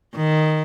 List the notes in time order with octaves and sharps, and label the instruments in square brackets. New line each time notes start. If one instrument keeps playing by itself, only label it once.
[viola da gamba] D#3